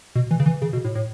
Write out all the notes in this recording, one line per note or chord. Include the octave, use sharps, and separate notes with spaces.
B2
E3
C#3
E3
C#3
B2
A2
A2